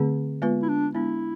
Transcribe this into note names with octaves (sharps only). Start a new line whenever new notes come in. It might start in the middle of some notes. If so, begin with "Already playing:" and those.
Already playing: D3 A3 C4 G#4
G#3 B3 F4 B4
E4
D4
G#3 B3 D4 E4